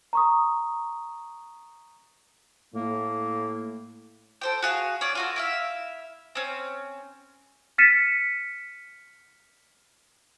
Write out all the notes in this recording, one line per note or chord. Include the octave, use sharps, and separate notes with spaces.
A#5 C#6 D#6
A2 A#3
A4 C5 G5
F#4 G#4 F5
C#4 D5
F4 F#4 A4
E4 E5 F5
C4 C#4
F6 A6 B6 C#7 D#7 E7